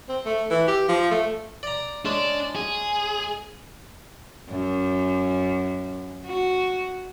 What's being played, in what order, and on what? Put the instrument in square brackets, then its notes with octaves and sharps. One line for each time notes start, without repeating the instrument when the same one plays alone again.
[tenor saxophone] C4
A3
E3
G4
F3
A3
[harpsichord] D5 A#5
[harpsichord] G#3 C#4 [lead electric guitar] D4
[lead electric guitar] G#4
[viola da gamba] F#2
F#4